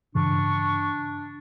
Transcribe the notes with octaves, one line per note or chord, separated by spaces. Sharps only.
G2 C#3 E3 D4 C#6